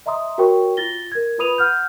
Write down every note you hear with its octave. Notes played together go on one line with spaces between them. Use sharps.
D#5 E5 A#5 C6 D#6
F#4 A#4 C#5 G5 C#6
F4 A6 A#6 G7
A#4 G#6
F4 B4 B5 D#6 D#7 F7
F#5 F6 G6